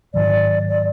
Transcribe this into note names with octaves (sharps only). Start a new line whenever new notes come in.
G#2 D#3 F#3 D5
D5